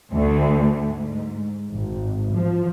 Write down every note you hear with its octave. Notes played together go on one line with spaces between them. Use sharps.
D2
G#2
G#1
F3